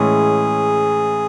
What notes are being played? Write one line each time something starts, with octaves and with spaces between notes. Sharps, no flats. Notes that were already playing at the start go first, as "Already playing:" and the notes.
Already playing: A2 E3 G#3 C#4 G#4